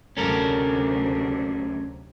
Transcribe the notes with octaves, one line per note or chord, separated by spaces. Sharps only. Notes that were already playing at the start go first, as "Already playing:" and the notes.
D2 C3 F#3 C#4 A4 A#4